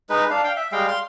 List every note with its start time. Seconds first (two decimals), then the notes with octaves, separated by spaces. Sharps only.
0.10 G#3 D#4 B4
0.30 D4 F5
0.44 F5 G5
0.57 E5
0.72 G3 G#3 F5 G5
0.88 F5 C6